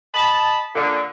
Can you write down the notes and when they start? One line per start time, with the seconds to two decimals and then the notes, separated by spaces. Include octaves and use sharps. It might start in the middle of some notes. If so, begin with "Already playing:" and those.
0.14 D#5 A5 B5
0.75 A#2 D3